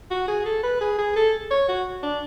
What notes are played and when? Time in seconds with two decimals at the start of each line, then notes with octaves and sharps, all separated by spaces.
0.10 F#4
0.28 G#4
0.45 A4
0.63 B4
0.81 G#4
0.99 G#4
1.16 A4
1.51 C#5
1.69 F#4
2.03 D4